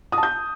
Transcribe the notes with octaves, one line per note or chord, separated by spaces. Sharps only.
D#6
A5
G6